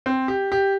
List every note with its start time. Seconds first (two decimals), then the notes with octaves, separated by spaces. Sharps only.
0.06 C4
0.28 G4
0.52 G4